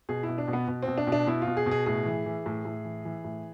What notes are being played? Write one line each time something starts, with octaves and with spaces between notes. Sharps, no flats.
B2 G#4
E4
B2
D4
B2
B3
B2
B2 C4
D4
B2
D4
B2 E4
F4
B2
G#4
B2
G#4
A2 G#4
E3
E3
A2
A2
E3
E3
A2